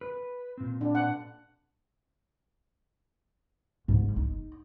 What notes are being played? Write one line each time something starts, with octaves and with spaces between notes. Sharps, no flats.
B4
A#2 C4
D4
F#5
G#2
D#4